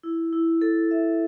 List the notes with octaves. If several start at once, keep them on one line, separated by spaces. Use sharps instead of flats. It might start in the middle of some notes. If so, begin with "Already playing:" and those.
E4
E4
A4
E5